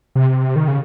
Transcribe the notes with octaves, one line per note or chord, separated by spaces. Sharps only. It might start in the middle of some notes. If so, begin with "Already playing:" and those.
C3
D#3
C#3